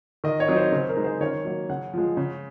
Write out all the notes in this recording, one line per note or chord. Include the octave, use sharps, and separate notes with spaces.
D#3 D#5
C#5
F#3 C4 D#4
C5
C#3 C5
A#4
G#3 D#4
C5
D#3 C#5
F#3 A#3
C#3 F#5
F3 G#3
C#3